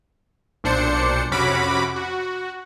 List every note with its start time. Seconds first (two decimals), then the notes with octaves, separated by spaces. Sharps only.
0.64 B1 A#2 D4 C5 C#7
1.31 F2 C3 C#4 F#4 B5 D6
1.96 F#4